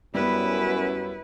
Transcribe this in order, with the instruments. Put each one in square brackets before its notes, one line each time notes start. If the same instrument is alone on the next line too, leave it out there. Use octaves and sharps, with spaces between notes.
[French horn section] F#2 [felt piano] G3 B3 [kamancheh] E4 B4